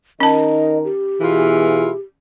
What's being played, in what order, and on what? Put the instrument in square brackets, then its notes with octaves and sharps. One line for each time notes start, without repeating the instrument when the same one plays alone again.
[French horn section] D#3 D#4 A#4 [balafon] C#4 A5 [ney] D#5
[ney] G4
[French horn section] B2 G#4 [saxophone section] E3 E4 F4